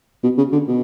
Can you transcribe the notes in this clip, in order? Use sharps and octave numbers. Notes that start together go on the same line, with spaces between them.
B2
C#3
D3
B2